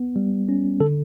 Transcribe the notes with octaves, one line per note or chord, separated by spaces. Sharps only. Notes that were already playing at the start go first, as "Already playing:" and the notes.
Already playing: B3
G3
C#4
D3 A4